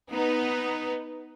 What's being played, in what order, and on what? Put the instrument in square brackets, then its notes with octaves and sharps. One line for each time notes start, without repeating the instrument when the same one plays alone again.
[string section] B3 D#4 B4